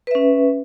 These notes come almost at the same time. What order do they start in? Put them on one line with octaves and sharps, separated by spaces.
B4 E5 C#4